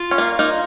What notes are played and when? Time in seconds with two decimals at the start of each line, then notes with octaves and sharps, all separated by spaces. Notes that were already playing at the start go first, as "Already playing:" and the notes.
Already playing: F4
0.11 C#4
0.18 A#3
0.39 A#3 D#4